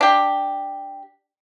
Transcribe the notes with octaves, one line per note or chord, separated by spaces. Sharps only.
D4 G4